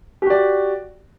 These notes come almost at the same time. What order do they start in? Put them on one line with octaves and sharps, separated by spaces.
G4 F#4 D5